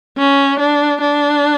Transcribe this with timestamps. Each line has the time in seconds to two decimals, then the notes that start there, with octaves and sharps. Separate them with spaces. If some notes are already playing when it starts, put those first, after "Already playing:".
0.18 C#4
0.59 D4
1.01 D4